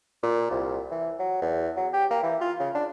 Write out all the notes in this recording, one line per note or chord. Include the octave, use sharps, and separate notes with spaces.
A#2
C2
E3
F#3
E2
F#3
G4
A#3
E3
F4
C#3
D4